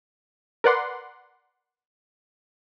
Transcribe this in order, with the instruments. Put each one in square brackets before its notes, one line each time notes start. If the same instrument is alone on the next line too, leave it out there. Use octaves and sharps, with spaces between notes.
[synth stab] A#4 B4 D5 F#5 C6